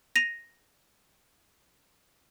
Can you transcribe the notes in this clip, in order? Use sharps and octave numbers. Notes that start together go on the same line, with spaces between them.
A#6 D#7 F7